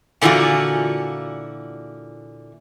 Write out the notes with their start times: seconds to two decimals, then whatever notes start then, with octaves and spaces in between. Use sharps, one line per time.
0.21 A#2 D3 E3 F4 F#4